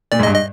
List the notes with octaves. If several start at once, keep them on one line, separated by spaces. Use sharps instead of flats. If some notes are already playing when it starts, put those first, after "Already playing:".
A#2 D5
G#2
D#5
G2
D#5